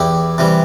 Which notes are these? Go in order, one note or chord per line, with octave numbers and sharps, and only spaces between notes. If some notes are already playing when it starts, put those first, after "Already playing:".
Already playing: E2 E4 G4
C3 E3 G3